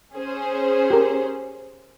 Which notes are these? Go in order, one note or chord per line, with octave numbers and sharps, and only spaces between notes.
C#4 G#4 C5
G4 A#4